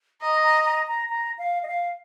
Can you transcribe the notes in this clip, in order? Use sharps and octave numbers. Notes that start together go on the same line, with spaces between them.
D#5 A#5
A#5
A#5
A#5
A#5
F5
D#5
F5